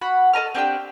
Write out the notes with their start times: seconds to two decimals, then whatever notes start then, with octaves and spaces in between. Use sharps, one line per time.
0.01 F#4 F#5 B5
0.33 A4 D#5 A#5 F6
0.55 C4 D4 G4 G5